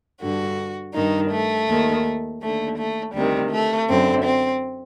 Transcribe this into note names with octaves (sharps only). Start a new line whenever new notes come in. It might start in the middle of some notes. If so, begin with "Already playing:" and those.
G2 D3 F#4
G2 D#3 D#4
A3
D#2 D#3
D#2 D3 A3
A3
D2 C3 D#3 G3
A3
F#2 D3 C4
C4